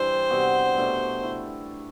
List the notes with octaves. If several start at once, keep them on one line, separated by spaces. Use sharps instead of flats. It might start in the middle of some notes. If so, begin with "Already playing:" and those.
Already playing: E3 G3 D4 C5
C3 G3 B3 F#4
B2 A3 D4
E4